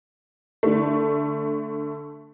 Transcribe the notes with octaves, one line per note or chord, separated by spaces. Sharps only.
D3 A3